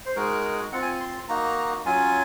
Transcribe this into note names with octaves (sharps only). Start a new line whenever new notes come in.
C5
G#3 D#4 F#4 A#4
C4 F4 F#5
G#5
C6
A#3 D#4 F#4 A#5
F#3 C#4 F4 G#5